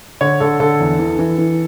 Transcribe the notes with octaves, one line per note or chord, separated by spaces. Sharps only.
D3 C#5
D3 A4
D3 A4
E2
E3
E3
E3